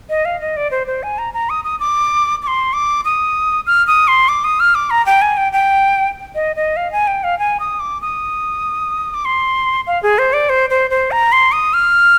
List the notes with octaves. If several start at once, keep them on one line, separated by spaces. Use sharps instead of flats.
D#5
F5
D#5
D5
C5
C5
G#5
A#5
A#5
D#6
D#6
D6
D6
C6
D6
D#6
F6
D#6
C6
D6
D#6
F6
D6
A#5
G5
G#5
G5
G5
D#5
D#5
F5
G#5
G5
F5
G#5
D#6
D6
D#6
D6
C6
F5
G#4
C5
D5
C5
C5
C5
A#5
C6
D#6
F6